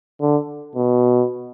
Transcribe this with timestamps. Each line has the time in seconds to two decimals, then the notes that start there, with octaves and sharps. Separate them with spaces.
0.21 D3
0.75 B2